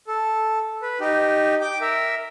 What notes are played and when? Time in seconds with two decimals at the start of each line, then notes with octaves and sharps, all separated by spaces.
0.07 A4
0.82 B4
1.01 D#4 G4
1.61 G5 D6
1.81 A#4 E5